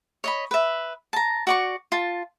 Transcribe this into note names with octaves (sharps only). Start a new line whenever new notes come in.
C#5 D#5 B5
B4 E5
A5 A#5
F#4 D5 C#6
F4 A5